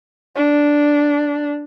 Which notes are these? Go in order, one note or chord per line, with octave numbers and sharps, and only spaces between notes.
D4